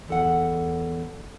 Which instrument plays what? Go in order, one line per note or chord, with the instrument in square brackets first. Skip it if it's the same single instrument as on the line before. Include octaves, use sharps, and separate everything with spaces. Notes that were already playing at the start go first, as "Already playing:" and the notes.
[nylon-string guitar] E2 A4 F#5